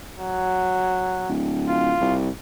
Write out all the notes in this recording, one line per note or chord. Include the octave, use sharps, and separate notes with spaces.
F#3
D1
F4
C2